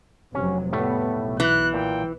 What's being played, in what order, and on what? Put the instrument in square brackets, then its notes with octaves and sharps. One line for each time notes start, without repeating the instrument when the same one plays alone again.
[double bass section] F1 C3 F#3 [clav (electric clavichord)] C#4
[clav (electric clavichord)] A2 G3 A3 [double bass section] B3
[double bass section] B1
[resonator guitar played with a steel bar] E3 [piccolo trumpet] F#6
[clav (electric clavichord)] A#2 [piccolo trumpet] G5